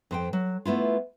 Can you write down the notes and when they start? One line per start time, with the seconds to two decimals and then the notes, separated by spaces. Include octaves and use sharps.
0.11 F2 C5 G5
0.33 F#3
0.65 A3 B3 E4 F4